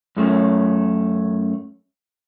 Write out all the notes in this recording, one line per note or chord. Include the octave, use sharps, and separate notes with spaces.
F#2 A3 C#4